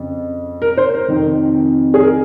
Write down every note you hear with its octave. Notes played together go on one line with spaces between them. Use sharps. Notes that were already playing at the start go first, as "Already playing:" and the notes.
Already playing: F2 C#3
A#4
C5
A#4
F2 C3 D#3
G#4
A#4